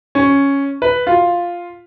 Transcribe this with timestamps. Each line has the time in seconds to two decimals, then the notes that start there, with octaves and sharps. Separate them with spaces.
0.15 C#4
0.82 B4
1.07 F4